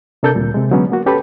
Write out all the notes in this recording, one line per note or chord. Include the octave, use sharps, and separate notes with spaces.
C3 D4 A4 A#4 G6
D2 A#2 G3
C3 G#3
D3 F#3 G#3 B3 C#4
A#3 F#4
C#4 G4 A4 B4 B5